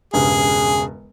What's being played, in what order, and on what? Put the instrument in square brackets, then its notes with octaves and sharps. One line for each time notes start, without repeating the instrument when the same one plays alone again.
[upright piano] E1 G2 C#3 [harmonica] G#4